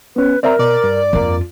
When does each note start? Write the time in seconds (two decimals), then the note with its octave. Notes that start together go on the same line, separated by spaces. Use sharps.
0.16 B3 C#4 B4
0.43 C4 A#4 D5 E5 A#5
0.59 B2 D5
0.84 G2
1.13 F2 A#3 F4